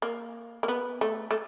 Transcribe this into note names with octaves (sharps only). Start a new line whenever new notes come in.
A#3
A#3
B3
A3
A3